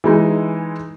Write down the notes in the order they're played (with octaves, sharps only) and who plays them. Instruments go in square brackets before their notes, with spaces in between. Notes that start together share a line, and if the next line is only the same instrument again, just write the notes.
[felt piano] E3 G#3 D#4